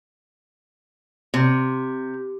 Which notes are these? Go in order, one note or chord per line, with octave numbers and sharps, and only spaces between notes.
C3